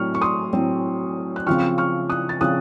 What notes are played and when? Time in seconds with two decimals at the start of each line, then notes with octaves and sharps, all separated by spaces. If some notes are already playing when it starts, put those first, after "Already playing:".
Already playing: A2 F#3 C4 C#6 F6
0.15 C#6
0.21 C6 D#6
0.53 A2 F#3 C4
1.36 F#6
1.47 C#3 F3 C4 C#6 F6
1.78 C#6 F6
2.10 D#6 F#6
2.29 A6
2.41 C#3 F3 C4 D#6 F#6